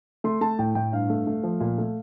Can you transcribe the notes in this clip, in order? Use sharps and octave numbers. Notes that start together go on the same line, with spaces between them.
A3 C6
A3 A5
A2 G5
A2 G5
G2 F5
A3
A3
F3
A#2
A3